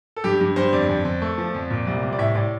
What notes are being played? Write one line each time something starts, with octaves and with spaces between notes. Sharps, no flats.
A4
G2 G4
G2
G2 C5
F2 D5
F2
F2
A3
F3
F2
A#2
C2
C2
D5
A2 E5
A2 D5